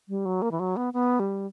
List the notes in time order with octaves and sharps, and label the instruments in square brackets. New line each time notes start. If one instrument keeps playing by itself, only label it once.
[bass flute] G3
F#3
A#3
E3
F#3
B3
B3
G3